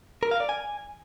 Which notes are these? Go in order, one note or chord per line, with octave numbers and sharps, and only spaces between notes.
A#4
F5
D5
G#5